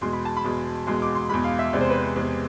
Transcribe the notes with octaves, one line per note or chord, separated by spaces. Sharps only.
E2 B2 G#3 C6
B5
A5
B5
E2 B2 G#3
E2 B2 G#3 C6
D6
C6
E2 B2 G#3 B5
F5
E5
E2 C3 G#3 D5
C5
B4
C5
E2 C3 G#3